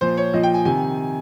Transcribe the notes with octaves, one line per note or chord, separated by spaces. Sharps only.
A#2 F3 C5
C#5
A#2 F3 D#5
G5
G#5
C3 D#3 G#5